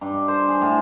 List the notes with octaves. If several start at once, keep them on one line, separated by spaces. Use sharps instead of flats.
G2
C5
G#4
A2